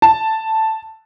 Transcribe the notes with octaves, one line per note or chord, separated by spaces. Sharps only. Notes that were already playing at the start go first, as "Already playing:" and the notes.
A5